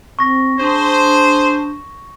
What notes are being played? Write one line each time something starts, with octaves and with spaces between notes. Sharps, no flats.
C4 C#6 A#6
D4 G#4 C5